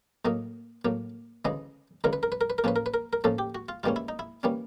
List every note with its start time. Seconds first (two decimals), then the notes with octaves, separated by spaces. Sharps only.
0.25 A2 F#3 A#3 D#5
0.85 A2 F#3 A#3
1.45 D2 C#3 E3 G#3 D#5
2.04 D2 C#3 E3 G#3 A#4
2.13 B4
2.23 A#4
2.32 B4
2.41 A#4
2.50 B4
2.58 A#4
2.64 A2 F3 A#3 C#4 B4
2.76 A#4
2.86 B4
2.94 A#4
3.13 A#4
3.24 A2 F3 A#3 C#4 A4
3.39 G4
3.55 F#4
3.69 F4
3.83 G#2 E3 G3 A#3 C#4 F4
3.96 E4
4.08 D#4
4.19 E4
4.43 E3 G3 A#3 C#4